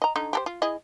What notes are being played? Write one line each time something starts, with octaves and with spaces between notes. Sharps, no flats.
D#5 A#5
D3 D#4
G4 A4 C5
F4
E4 G#4 D#5